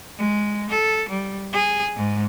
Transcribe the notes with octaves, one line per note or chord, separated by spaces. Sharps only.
G#3
A4
G3
G#4
G#2